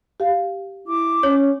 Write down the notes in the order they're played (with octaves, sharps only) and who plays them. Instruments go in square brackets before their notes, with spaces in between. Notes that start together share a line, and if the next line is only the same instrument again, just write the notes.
[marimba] G4 F5
[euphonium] E4 [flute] D6
[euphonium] C#4 [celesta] C#5